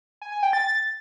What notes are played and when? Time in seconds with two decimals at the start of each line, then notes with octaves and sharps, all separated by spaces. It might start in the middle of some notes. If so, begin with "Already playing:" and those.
0.22 G#5
0.32 G#5
0.43 G5
0.53 A6